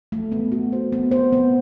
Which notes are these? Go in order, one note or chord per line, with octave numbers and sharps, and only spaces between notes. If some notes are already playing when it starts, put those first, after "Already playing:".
A3
B3
F#4
C5
B3
C5
B3